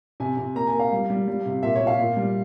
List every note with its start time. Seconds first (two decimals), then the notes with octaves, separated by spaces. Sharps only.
0.20 C3 G#5
0.37 C3
0.55 A#3 A#5
0.67 G#5
0.73 A#3
0.80 F5
0.92 G3
1.10 G3
1.28 G3
1.46 C3
1.63 A#2 E5
1.75 C#5
1.82 A#2
1.87 F5
2.00 A#2
2.17 G3